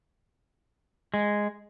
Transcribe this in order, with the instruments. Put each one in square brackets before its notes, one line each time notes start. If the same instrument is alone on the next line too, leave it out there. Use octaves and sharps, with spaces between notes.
[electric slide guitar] G#3